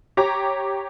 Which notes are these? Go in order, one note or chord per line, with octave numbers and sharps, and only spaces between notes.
G4 C#5 A#5